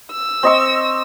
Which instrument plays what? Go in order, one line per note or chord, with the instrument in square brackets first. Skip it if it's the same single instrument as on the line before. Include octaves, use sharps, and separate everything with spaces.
[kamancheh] E6
[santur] C4 D#5 C#6